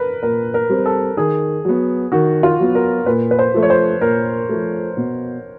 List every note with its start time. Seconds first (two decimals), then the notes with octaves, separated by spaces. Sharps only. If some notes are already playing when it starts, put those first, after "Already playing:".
Already playing: A#4 B4
0.22 A#2 A#4
0.54 A#4
0.69 G3 C4
0.86 A4
1.17 D#3 G#4
1.65 F#3 B3
2.12 D#3 F#4
2.43 F4
2.60 F#3 B3
2.75 A#4
3.06 A#2 B4
3.31 B4
3.39 C5
3.54 F3 A3
3.63 C#5
3.70 C5
4.01 A#2 A#4
4.49 F3 A3
4.97 B2